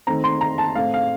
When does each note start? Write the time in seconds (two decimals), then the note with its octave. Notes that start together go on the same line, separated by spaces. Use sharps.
0.07 D#3 A3 C4 A#5
0.24 C6
0.41 A#5
0.58 A5
0.75 A2 A3 C4 F5
0.94 F5